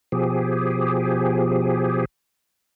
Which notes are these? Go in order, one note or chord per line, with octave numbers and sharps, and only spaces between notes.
B2 F3 G4 G#4